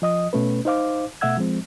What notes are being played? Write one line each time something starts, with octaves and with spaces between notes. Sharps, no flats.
F3 D#5 D#6
B2 A3 C#4 B4
D#4 C5 F5 D6
B2 A3 E5 F#5 E6 G#6
F3 G#3 C4